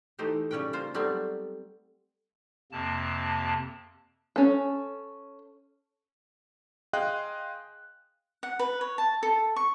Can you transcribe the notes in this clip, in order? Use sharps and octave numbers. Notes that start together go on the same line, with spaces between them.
E3 A3 D#4 G4 C5
C#3 G3 C#4 B4 G5
A#3 F4 C5 F5
F#3 G3 A3 B3 C4
F2 C3 A#3 A5
C#4 A4
G#4 D#5 F5 G5 C6 F#6
F#5
B4
C#5
A5
A4
C#6